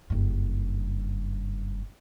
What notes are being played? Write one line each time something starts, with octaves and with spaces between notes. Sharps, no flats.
F#1 G2